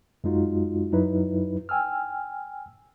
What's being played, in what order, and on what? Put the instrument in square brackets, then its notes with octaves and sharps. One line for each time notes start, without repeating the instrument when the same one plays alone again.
[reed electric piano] F#2 G#3 D#4 F4 F#4
F#2 F#3 D#4 E4 B4
G5 G#5 E6 F6